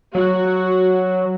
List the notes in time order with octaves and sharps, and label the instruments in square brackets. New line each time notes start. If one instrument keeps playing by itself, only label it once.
[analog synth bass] F#3 [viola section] F#4